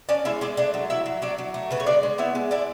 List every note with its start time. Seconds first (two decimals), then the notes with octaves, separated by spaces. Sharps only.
0.09 C#4 D4 D5
0.25 G#3 E4 E5
0.41 G#3 D4 D5
0.57 A3 D4 D5
0.74 F#3
0.90 F#3 E4 E5
1.06 F#3
1.22 F#3 D4 D5
1.38 F#3
1.54 A3
1.71 C#3 B4
1.80 C#5
1.86 G#3 D4 D5
2.03 G#3
2.18 B3 E4 E5
2.35 G#3
2.51 D4 E4 D5